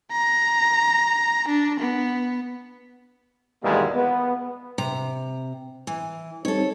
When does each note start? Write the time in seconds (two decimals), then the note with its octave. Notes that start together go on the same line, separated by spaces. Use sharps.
0.12 A#5
1.48 D4
1.79 B3
3.64 G#1 E2 B2 G3 G#3 A#3
3.95 B3
4.78 C3 A#5
5.87 E3
6.45 G3 C4 D#4 A4 C#5